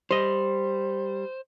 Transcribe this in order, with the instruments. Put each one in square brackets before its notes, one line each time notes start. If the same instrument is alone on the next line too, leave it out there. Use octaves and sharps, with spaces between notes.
[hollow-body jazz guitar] G3 D#5 [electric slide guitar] C5